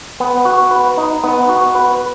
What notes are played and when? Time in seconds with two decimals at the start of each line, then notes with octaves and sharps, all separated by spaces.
0.20 B3
0.45 F#4
0.71 B4
0.98 D#4
1.24 B3
1.49 F#4
1.75 B4